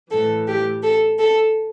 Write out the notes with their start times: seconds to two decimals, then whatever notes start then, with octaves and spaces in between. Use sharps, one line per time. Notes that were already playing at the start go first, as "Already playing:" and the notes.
0.11 A2 E3 A4
0.47 G4
0.83 A4
1.19 A4